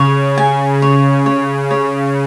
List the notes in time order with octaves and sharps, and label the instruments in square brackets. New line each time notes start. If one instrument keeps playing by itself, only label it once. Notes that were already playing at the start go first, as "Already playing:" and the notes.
Already playing: [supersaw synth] C#3 [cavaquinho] C#5
[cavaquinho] G#5
C#5
C#5
C#5